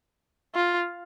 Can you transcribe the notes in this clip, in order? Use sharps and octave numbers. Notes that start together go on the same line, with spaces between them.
F4